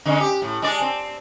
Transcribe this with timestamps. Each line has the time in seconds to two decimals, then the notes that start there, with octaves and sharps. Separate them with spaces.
0.05 D3 G#3 C#4
0.20 G4
0.42 A2
0.62 G#3 D4 D5
0.81 C4